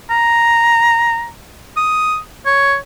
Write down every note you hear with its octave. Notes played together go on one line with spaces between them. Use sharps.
A#5
D#6
C#5